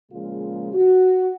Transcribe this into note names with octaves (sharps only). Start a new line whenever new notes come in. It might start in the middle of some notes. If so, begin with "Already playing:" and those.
A#2 C#3 F3 G#3 F4
F#4